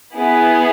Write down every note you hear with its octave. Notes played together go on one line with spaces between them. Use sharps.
B3 E4 G#4